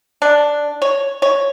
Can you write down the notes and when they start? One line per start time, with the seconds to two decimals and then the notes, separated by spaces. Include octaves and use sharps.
0.22 D4
0.82 C#5
1.22 C#5